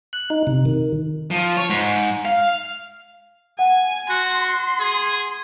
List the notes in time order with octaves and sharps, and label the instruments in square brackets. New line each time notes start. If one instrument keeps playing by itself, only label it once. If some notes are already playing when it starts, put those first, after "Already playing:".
[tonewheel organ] F#6
D#4
C3
D#3
[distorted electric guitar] F3
C#5
G#2
F5
[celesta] F#5 [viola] G#5
[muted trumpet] F#4 [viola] C6
[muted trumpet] G#4